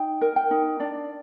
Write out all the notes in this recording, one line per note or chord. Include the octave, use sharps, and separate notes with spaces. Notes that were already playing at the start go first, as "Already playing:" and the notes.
Already playing: D#4 G5
A#4
G5
D#4
D4 D5